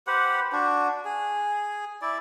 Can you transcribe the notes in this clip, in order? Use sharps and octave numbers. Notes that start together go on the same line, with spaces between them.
G4 B4 C5 F#5
D4 F#4
G#4
E4 D5